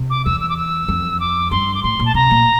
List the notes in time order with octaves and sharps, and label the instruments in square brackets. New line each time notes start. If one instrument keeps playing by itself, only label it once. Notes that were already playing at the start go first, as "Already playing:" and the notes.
Already playing: [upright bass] C3
[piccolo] D6
[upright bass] E2 [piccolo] E6
[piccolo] E6
D6
E6
[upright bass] F2
[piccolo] D6
[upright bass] G2 [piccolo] C6
[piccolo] D6
[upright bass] A2 [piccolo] C6
[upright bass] A#2
[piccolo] A5
[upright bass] C3 [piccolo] A#5
[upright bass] A#2